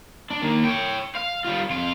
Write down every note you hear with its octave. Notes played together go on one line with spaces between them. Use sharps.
D4
D#3 A#3
C#5 G5
F5
G3 F4
F2 F4